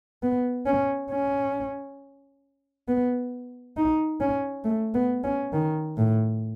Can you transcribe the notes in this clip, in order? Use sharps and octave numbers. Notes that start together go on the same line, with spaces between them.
B3
C#4
C#4
B3
D#4
C#4
A3
B3
C#4
D#3
A2